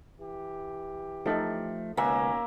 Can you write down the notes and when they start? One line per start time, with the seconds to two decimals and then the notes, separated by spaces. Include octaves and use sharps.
0.20 E3 G4
1.26 F3 A3 D#4 A4
1.97 C#2 B2 D#3 A#3 C#4 B4 E5 G#5